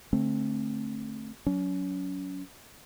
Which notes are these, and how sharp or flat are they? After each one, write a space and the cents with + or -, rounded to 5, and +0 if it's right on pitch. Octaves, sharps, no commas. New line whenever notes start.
D3 +0 A3 +0 C4 +25
F#3 +0 C#4 +30